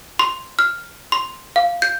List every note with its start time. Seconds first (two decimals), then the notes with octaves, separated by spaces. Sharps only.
0.19 C6
0.59 F6
1.12 C6
1.56 F5
1.82 G6